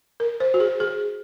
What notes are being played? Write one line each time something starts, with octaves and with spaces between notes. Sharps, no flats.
A#4
C5
F#4
G#4
G#4